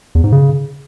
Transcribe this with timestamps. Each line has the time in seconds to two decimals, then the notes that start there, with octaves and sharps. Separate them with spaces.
0.15 E2
0.24 G#2
0.32 C#3